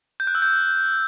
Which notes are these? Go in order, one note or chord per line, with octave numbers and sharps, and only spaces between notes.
G6
F#6
E6
G6